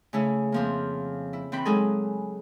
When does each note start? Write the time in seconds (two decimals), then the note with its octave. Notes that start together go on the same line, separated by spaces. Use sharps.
0.13 C#3 A3 C#4 E4
0.52 F2 F3 A#3
1.33 E4
1.52 E3 C4 G5 B5
1.65 F#3 G#3 D#4 G#4 A4